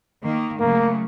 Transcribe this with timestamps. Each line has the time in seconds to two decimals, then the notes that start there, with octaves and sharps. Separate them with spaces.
0.24 D#3 A#3
0.60 C#3 F#3 A3 A#3